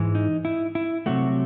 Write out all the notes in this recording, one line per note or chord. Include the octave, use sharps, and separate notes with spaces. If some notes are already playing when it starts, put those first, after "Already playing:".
Already playing: G#2 E3 G#3
D#4
E4
E4
C3 F#3 A3 F#4